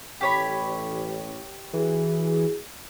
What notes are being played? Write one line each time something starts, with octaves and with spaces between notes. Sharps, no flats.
A1 G4 C#5 B5
E3 E4 F#4 G#4